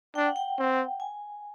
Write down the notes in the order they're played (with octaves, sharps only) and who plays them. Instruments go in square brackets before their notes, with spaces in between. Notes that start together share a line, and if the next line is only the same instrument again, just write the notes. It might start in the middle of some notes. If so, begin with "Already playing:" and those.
[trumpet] D4 [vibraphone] G5
[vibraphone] F#5
G5
[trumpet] C4
[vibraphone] G#5